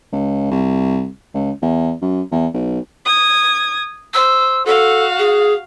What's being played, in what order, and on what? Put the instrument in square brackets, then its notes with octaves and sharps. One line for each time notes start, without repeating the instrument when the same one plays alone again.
[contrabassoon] C#2
C2
C#2
E2
F#2
E2
B1
[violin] D#6 G#6
[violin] C5 [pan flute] E6
[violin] F#4 F5 [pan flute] A4
[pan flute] G#4